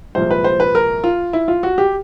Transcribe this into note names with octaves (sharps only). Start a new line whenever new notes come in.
C2 A#2 F3 G#3 C5
B4
C5
B4
A#4
F4
E4
F4
F#4
G4